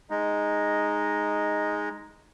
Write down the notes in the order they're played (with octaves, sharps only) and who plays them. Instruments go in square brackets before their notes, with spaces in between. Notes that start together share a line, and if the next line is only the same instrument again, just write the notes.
[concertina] G#3 D#4